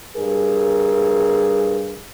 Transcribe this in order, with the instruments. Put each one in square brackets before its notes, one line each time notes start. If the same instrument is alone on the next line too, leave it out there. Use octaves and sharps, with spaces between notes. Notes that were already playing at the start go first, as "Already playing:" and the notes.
[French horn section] G2 G#4 A#4